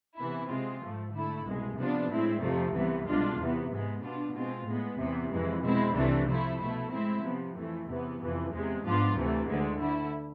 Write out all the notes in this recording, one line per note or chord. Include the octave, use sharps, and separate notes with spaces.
C3 E3 B3 E4
C3 G#3 C4 F4
G#2 F3 A3
D3 A3 E4
C2 B2 G#3
C3 F3 B3 D4 F4
A2 G#3 C4 E4
F2 C3 F3 A3
C2 C3 E3 B3
C2 B2 G#3 D4 F4
E2 C3 E3 B3
G#2 G#3 B3
B2 B3 D4 F4
B2 G#3 C4 F4
A2 G#3 B3
E2 C3 E3 B3
F2 E3 G#3
B2 G#3 C4 E4
C2 C3 E3 A3 D4
C3 F3 A3 E4
B2 A3 E4
A2 G#3 C4 E4
C3 F3 B3
F2 E3 A3
E2 C3 E3 B3
F2 C3 E3
E2 C3 G#3
G#2 F3 B3 D4 F4
D2 C3 E3 A3
D2 D3 G#3
D3 A3 E4